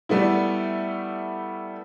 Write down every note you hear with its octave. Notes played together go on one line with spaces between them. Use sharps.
G3 A3 B3 E4